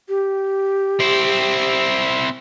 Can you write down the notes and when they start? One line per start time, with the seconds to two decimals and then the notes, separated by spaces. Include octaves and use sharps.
0.09 G4
1.00 C4 E4